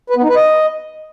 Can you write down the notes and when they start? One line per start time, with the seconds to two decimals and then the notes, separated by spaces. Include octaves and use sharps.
0.10 B4
0.16 B3
0.23 D#4
0.30 B4
0.36 D#5